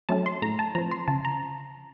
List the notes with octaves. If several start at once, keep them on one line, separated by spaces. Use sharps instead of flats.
F#3 A3 C#4 A5
C6
A2 A#5
A5
F3 C4 A#5
C6
C#3 A5
A#5